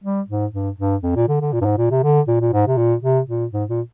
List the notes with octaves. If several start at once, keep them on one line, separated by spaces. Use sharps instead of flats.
G3
G#2
G2
G2
F2
A#2
D3
D3
A#2
G2
G#2
A#2
C3
D3
A#2
A#2
G#2
C3
A#2
C3
A#2
G#2
A#2